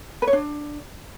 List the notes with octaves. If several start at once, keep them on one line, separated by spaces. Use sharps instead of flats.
B4
C#5
D4